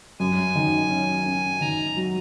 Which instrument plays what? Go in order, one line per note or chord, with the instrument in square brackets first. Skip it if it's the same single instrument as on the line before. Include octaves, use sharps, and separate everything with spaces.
[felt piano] F#2 [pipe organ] G#5
[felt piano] D#3
C#4
C#4
[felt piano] D#3 [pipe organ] A#5
[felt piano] F#3